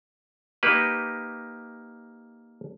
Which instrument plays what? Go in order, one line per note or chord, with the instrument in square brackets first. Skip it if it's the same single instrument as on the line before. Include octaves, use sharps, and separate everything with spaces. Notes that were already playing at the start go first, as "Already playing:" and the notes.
[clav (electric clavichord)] A#3 D#4 G4 B4